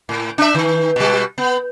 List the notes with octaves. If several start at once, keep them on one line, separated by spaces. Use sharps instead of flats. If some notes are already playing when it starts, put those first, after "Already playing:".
A2
D4 E5
D#3
B2 G3
B3